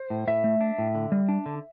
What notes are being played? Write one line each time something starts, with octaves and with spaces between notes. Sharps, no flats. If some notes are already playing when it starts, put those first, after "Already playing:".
Already playing: C5
A2
A2 E5
A3
D4
A2
D3
G3
D4
D3